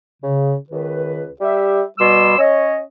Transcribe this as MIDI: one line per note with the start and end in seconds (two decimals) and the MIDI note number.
0.23 0.55 49
0.70 1.25 37
0.70 1.25 51
0.70 1.25 71
1.40 1.82 55
1.40 1.82 67
1.40 1.82 76
1.99 2.37 47
1.99 2.37 55
1.99 2.37 84
1.99 2.37 86
1.99 2.37 88
2.38 2.80 61
2.38 2.80 73
2.38 2.80 75